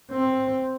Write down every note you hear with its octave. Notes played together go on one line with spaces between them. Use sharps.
C4